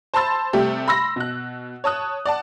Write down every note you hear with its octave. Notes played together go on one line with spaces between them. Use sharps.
C5 A5 B5 C6 E6 A6
C3 G3 A3 G4
B5 C6 E6 A#6
B2 F#6
C#5 A5 D#6 F#6
D5 F#5 A5